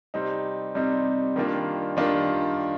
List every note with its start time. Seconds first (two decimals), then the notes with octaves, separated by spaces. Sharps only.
0.14 C3 G3 C4 D#4
0.75 C3 G3 C4 D#4
1.36 D#3 G3 A#3 D4 F4
1.97 D#3 G3 A#3 D4 F4